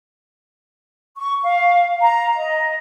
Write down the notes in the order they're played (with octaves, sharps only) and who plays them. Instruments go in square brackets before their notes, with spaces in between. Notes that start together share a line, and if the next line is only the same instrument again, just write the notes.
[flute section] C#6
F5
A#5
D#5